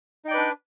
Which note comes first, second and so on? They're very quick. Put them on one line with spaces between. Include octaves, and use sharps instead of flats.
D#4 G5 D5 B4 D4